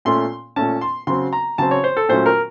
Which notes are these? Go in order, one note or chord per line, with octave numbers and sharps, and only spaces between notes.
A#2 A3 C#4 C6
A#2 A3 C#4 A5
C6
C#3 F#3 C4 C6
A#5
C#3 F#3 C4 A5
C#5
C5
A4
A#2 F#3 A3 C#4 C5
A#4